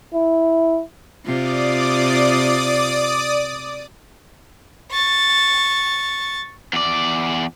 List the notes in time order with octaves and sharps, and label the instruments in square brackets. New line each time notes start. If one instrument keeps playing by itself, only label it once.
[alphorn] E4
[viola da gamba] C3 F4 [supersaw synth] D5 D6 D#6
[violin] C#6 A6
[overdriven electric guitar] E2 D5